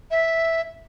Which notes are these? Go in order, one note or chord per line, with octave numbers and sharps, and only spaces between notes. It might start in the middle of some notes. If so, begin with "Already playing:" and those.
E5